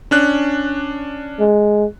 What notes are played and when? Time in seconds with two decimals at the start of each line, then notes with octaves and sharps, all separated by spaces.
0.11 C#4 D4 F#6
1.40 G#3